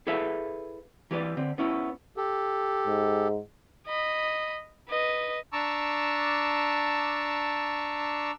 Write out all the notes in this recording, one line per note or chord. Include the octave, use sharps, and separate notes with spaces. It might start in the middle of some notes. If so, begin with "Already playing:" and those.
E4 G#4 A4 B4 E5 F5
E3 G4 B4 D5
D3 C4
B3 C#4 E4
G4 A4
G#2
D#5 B5
B4 D#5
D4 A5 A#5 C#6 D6 E6